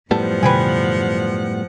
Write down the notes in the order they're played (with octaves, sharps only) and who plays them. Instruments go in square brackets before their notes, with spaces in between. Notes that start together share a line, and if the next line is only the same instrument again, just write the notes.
[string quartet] F#2 F3 F#5 [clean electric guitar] A2 G3 B3 [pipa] A4
[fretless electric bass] B2 D3 F#3 [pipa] B4 G5 G#5